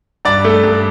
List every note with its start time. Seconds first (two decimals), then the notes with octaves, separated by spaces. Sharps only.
0.25 G2 D5
0.44 A3
0.63 G2